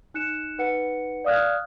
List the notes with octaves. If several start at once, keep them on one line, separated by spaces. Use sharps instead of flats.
D#4 F#6 C#7 E7
D#4 B4 F#5 C#7
D5 F5 D#6 F6 F#6 G#6